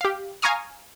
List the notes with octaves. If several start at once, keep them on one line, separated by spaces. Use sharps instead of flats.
G4 F5
F5 G#5 A#5 C#6 D#6 F6